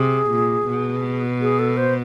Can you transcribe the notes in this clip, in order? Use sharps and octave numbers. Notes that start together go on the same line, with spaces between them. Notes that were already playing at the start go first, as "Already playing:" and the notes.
Already playing: C3 G#4
A#2
B2
G#4
A4
C5